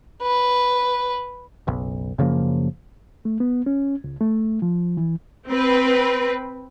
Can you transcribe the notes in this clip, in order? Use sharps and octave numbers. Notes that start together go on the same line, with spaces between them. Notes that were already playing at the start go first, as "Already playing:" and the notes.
B4
F#1 B1
F#2 C#3 F3 A#3
A3
B3
C#4
C#2
A3
F3
E3
C4 B4